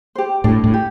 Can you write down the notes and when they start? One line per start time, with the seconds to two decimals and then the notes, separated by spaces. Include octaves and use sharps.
0.15 G4 C5
0.44 A2 D4
0.64 A2
0.74 G4